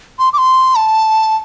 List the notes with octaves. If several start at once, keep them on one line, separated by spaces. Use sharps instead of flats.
C6
D6
C6
A5